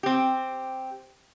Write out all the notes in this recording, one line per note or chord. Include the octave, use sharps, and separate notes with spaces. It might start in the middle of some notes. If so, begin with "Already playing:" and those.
C4 G4